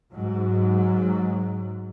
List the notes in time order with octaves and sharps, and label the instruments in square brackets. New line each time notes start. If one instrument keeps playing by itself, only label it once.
[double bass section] G#2 F#3